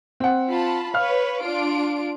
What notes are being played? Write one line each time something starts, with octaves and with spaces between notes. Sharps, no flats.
C4 F#5
F4 A5 B5
B4 C#5 F5 F6
D4 F4 D7